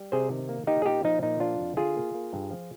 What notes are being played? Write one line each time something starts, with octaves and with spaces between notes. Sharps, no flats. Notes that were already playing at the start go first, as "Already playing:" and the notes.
Already playing: G3
C3 G#4 C5
D#3
A#3
A#3 D#4 G4
G#4
A#2 D#4 G4
F3 D#4
A#2 D#4
F3 D4 F4
F2
D3 F4 G#4
A#3
A#3
G2
F3